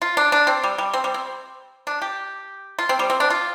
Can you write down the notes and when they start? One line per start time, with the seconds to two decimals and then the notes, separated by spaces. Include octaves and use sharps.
0.02 F4
0.17 D4
0.32 D4
0.47 C4
0.64 G3
0.78 G3
0.94 C4
1.04 G3
1.14 C4
1.87 D4
2.02 G4
2.79 F4
2.89 C4
2.99 G3
3.10 C4
3.20 D4
3.30 F4